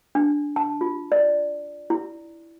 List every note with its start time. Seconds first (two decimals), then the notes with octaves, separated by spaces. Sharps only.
0.15 D4
0.56 A5
0.81 F4
1.12 D5
1.90 E4